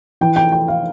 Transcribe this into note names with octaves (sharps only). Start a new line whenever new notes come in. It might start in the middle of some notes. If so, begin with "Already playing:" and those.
E3 G5
G5
G5
F5